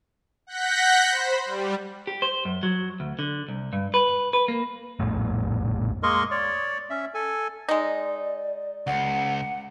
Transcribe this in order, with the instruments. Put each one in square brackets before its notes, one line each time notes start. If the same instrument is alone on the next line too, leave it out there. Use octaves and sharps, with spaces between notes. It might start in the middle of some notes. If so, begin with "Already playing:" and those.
[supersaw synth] F#5 F#6 G6 A#6 B6
C5 B5
G3
[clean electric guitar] G4
C5
F#2
F#3
D2
D3
C2
G2
B4
B4
A#3
[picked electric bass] A#1 F2 A2 A3
[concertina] G#3 A#3 A#4 D#5 C6 C#6
C#5 D5
C#4 E5
A4 G#5
[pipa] G#3 D#4 [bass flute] D5
[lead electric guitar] C#2 [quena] F#5